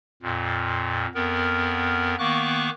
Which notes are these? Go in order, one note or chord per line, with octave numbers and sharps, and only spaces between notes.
F2 A#2
F2 B3 A#4
D#3 A#3 B3 C#6 D6 F#6